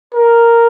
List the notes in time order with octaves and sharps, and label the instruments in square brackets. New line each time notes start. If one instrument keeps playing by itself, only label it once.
[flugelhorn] A#4